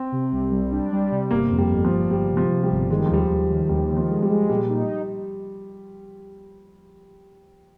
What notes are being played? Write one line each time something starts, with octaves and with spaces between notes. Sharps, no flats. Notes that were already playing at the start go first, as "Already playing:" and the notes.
Already playing: C4
C3
C2
G3
D4
G3
C3
G1 A#3
F2
G3
G1
F3
G1
G1 G3
C3
F3
C3
G3
G1
D#3 G#3
G3
F3
D#2 G3
D#2
D#3
D#2 G3
D#3
F3
G#3
G3
G#3
A#2 G3
D#4